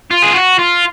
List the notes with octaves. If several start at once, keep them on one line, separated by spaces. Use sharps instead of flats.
F4
G#4
F#4
F4